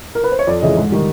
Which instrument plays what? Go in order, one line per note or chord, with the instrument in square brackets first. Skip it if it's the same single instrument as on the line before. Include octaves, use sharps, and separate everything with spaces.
[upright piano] A#4
B4
C5
C#5
F2 D5
C#3 E3 G#3 D#5
G#2
D#3 G3